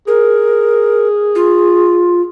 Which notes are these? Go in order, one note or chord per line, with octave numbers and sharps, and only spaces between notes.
G#4 A#4
F4